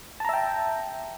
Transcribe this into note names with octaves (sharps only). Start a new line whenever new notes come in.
E5 G5 A5 A#5